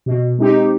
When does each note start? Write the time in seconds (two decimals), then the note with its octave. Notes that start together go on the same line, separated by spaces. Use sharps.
0.06 B2
0.39 G#3 C4 D#4 G4